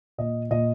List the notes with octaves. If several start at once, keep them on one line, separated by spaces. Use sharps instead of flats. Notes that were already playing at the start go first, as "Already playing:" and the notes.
A#2 D#5
A#2 D#5